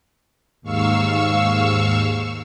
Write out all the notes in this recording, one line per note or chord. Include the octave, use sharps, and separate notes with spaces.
D#2 G#2 F5 C#6 E6